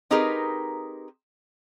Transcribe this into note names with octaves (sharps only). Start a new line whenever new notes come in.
C4 D#4 G4 G#4 A#4 B4